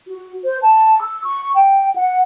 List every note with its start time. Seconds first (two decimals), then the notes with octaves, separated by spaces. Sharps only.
0.08 F#4
0.44 C5
0.61 A5
1.01 E6
1.24 C#6
1.55 G5
1.96 F#5